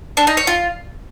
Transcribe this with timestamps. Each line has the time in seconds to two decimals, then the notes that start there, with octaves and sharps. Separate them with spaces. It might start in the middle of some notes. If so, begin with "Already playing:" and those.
0.17 D4
0.27 D#4
0.37 C#5
0.47 F4